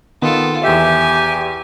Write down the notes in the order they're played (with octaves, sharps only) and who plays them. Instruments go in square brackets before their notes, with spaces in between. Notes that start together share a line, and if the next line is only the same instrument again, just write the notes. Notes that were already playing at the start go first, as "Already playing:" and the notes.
[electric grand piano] D#3 B3 [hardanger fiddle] F4 A4
[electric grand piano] E2 E5 [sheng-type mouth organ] G4 [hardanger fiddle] G#5